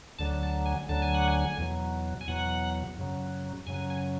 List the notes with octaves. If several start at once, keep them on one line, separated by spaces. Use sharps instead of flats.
D2 D3 F#3 A5
A5
G#5
D2 D3 F#3 A5
G#5
F#5
G#5
E2 B2 F#3
G#5
E2 B2 F#3 F#5
F#2 C#3 F#3
F#2 C#3 F#3 G#5
G#5